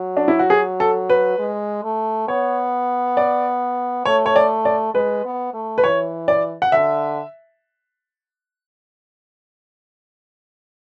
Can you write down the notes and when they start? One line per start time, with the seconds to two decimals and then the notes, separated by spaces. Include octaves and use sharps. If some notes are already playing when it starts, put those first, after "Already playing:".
Already playing: F#3
0.17 D4
0.28 E4
0.39 F#4
0.50 G#4
0.80 A4
1.10 B4
1.39 G#3
1.84 A3
2.28 B3 C#5
3.17 D5
4.06 A3 C#5
4.26 C#5
4.36 D5
4.65 D5
4.94 G#3 B4
5.25 B3
5.53 A3
5.78 B4
5.84 E3 C#5
6.28 D5
6.62 F#5
6.72 D3 E5